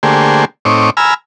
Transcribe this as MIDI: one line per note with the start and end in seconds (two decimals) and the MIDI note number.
0.03 0.45 50
0.03 0.45 57
0.03 0.45 58
0.03 0.45 67
0.03 0.45 68
0.03 0.45 72
0.65 0.90 45
0.65 0.90 60
0.65 0.90 63
0.65 0.90 73
0.65 0.90 86
0.97 1.14 80
0.97 1.14 82
0.97 1.14 83
0.97 1.14 88
0.97 1.14 89